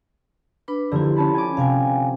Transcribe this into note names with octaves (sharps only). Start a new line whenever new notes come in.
D4 B4 B5
D3 F3 A#3 E4 G4
C#4 A5 B5
G#5 D6
C3 F5 G5 G#5